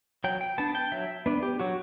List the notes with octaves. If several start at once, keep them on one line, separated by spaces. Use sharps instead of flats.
F#3 G5
G5
B3 D4 A5
G5
F#3 E5
B3 D4
G4
F#3 F#4